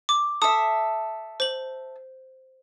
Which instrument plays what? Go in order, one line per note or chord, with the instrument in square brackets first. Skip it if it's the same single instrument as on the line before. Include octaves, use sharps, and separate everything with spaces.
[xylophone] D6
[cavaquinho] A4 E5 [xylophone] D#6
[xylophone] C5 F#7